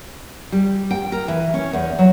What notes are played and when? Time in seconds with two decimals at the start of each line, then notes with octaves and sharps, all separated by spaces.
0.52 G3
0.91 G5
1.12 A#4
1.28 E3
1.54 C#4
1.73 E2
1.99 F#3